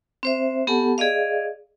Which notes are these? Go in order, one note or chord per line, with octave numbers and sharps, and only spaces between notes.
C4 C5 E5
B3 G4 A4 F#5 G#5 A5
G#4 D5 D#5 F5